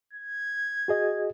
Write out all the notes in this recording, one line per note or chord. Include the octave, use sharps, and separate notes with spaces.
G#6
F#4 G#4 D#5